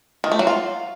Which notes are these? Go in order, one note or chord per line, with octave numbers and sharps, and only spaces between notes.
D#3
A3
F#3
F4